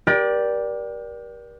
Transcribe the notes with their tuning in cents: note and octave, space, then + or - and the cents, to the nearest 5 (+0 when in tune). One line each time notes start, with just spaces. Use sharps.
G4 +0 A#4 +40 D5 +0